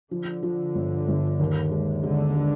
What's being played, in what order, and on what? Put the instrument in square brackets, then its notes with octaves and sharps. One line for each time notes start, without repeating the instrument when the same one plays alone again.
[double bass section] D3 [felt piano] F3
[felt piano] F3
G1
G1
D#2
G#3
[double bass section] D3 [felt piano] G#3
[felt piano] G#3